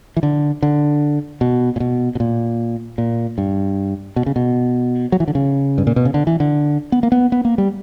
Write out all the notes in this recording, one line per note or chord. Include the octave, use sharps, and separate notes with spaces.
E3
D3
D3
B2
A#2
B2
B2
A#2
A#2
G2
B2
C#3
B2
F#3
E3
D3
C#3
G2
A#2
B2
C#3
D3
E3
D3
B3
A#3
B3
B3
A#3
G3